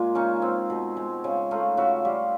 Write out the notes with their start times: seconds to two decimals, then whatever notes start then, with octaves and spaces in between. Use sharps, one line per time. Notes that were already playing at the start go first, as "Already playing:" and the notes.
Already playing: A#2 G#3 A#3 F4
0.15 C#3 C#4 D#4
0.42 C4
0.70 B2
0.97 G#3
1.24 C#3
1.51 A3 D#4 F4
1.77 C#3 E4 F#4
2.05 G3 F4 G4